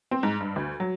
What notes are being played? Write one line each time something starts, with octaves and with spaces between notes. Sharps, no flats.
C4
G#2
G2
D2
F#3